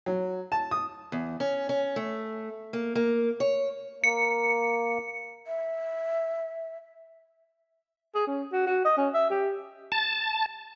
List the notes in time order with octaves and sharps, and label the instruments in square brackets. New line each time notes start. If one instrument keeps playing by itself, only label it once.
[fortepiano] F#3
A5
D#6
[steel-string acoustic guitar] E2
C#4
C#4
A3
A#3
A#3
C#5
[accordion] A#3 [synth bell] C#7
[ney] E5
[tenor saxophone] G#4
C#4
F#4
F#4
D#5
C#4
E5
G4
[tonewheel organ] A5